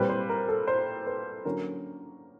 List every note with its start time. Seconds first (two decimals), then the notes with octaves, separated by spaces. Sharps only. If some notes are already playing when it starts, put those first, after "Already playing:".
Already playing: A#2 G3 C4 B4
0.09 C5
0.29 A#4
0.48 A4
0.68 C5
1.07 B4
1.45 D3 F#3 A#3 C#4 A#4